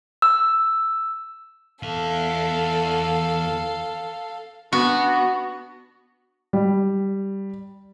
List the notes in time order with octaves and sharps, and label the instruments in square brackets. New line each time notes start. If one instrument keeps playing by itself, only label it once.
[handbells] E6
[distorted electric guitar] E2 E5 [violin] A4 F5
[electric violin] B3 D4 [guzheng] F#4
[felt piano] G3